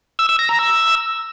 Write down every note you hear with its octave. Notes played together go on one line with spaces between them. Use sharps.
E6
E6
A#6
A#5
E6